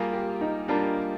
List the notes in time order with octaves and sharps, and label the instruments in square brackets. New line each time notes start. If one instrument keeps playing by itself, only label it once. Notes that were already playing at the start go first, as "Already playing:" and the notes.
Already playing: [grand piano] G3 A#3 F4 A#4 [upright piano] G#4
[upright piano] G4
D#4
[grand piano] G3 A#3 F4 A#4 [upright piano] D4